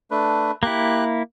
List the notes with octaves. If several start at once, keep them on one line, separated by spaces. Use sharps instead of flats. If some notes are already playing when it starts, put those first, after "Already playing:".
A3 D4 B4
A#3 E4 G4 F#6